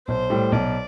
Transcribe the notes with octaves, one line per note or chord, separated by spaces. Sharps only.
B1 C5
A2 G3
B1 D5